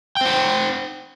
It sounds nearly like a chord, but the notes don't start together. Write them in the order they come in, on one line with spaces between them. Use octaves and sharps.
G5 C5 F#5